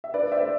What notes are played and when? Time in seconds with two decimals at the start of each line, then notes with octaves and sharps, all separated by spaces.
0.04 E5
0.14 D4 B4 D5
0.32 C5 E5
0.41 A3